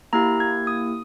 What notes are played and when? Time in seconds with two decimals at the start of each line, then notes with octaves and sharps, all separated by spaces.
0.13 A#3 E4 G4 A#5
0.40 G#6
0.67 D#6